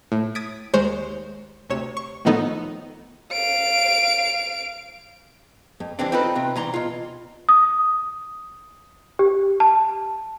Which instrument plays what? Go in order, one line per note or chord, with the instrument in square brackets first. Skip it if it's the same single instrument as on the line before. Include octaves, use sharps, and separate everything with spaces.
[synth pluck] A2
D#6 G#6 A6 B6 D7
D#2 G#3 C5 C#5 G#6
D2 C3 C#5 E7
C#6
A2 D#3 F3 B3 D#4 A4
[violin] F5 D7
[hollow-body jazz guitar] F2
E3 G3 C4 D4
C4 D#4 F4 A4 B4
C3 C4
C2 E3 A#5 C6
B2 F4
[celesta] D#6
G4
A5